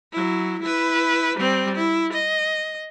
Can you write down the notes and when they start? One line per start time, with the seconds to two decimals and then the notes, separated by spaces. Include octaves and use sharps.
0.12 F#3 E4
0.63 E4 B4
1.38 G3 C4
1.76 E4
2.13 D#5